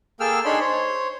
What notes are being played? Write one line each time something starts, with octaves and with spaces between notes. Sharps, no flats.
A#3 G#4 A4 G5 E6 F6
D4 D#4 G#4 C#5 B5 C6
C5 C#5